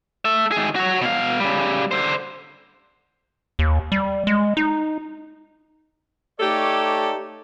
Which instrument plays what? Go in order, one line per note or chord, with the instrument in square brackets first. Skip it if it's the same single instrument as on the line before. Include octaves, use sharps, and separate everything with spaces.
[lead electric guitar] A4 E5
D#3 G#4
F#4 C#5
B2 F5
C#3 G3
D3 C5
[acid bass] D#2
G3
G#3
D#4
[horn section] A3 D#4 G4 A4 C#5 D5